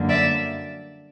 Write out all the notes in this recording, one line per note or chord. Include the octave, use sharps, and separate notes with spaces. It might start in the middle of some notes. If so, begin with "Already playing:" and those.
Already playing: F#2 D3 G3 A#3
D5 E5